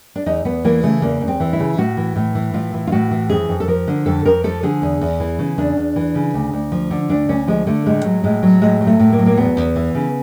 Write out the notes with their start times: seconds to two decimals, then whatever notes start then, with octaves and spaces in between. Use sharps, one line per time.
0.16 D4
0.26 E2 D#4
0.45 E2 B3
0.64 E3 A#3
0.83 C#3 A3
1.02 E2 A#3
1.21 E2
1.28 C4
1.40 E3
1.53 E4
1.60 C#3
1.78 A2 F#4
1.97 E3
2.16 A2
2.35 E3
2.54 A2 F4
2.74 E3
2.87 F4
2.92 A2 F#4
3.11 E3
3.30 F2 G#4
3.49 F2
3.60 A4
3.68 F3 A#4
3.87 D3
4.06 F2 A4
4.25 F2 A#4
4.44 F3 A4
4.63 D3 G#4
4.82 E2
5.01 E2
5.20 E3
5.39 C#3
5.58 E2 D4
5.77 E2
5.96 E3
6.15 C#3
6.34 D2
6.53 D2
6.72 F3
6.91 D3
7.09 D2 D4
7.29 D2 C#4
7.48 F3 G#3
7.67 D3 A3
7.86 A2 G#3
8.05 F#3
8.24 A2 G#3
8.43 F#3
8.62 A2 G#3
8.81 F#3
8.87 A3
9.00 A2
9.12 A#3
9.19 F#3
9.26 A#3
9.37 E2 B3
9.57 E2
9.76 E3
9.95 C#3